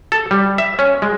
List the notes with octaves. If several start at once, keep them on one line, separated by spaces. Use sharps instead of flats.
A4
G3
E5
C#4
G#3